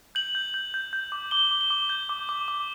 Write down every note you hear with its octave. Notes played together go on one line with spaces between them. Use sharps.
G6 F#7
G6
G6
G6
G6
D6
D6 G7
D6
G7
D6
G6
D6
D6
D6